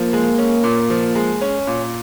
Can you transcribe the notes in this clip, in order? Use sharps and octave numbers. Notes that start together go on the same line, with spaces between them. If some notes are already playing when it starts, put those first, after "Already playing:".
Already playing: F3 A#3
G#3
C#4
A#2
F3
G#3
C#4
A#2